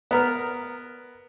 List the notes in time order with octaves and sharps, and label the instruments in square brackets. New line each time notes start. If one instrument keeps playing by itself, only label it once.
[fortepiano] B3 A#4 F6